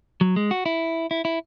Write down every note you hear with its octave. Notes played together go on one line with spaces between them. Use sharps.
F#3
G#3
F#4
E4
E4
E4